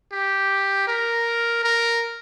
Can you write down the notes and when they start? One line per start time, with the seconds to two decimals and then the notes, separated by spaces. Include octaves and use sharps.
0.13 G4
0.88 A#4
1.64 A#4